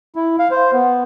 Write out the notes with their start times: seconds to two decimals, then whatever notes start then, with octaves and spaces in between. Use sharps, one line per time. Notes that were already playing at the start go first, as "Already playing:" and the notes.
0.16 E4
0.39 F5
0.51 C5
0.73 B3